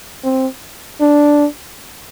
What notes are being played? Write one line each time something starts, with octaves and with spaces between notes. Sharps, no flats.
C4
D4